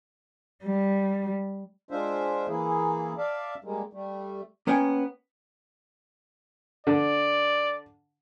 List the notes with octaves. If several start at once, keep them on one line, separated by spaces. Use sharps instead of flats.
G3
G#3 D4 F4 C5 E5
E3 A#3 E4 G#4
D5 E5 F5 A5
G3 G#3 A#3
G3 A3
A#3 B3 C#4 C#5 G5
D3 D5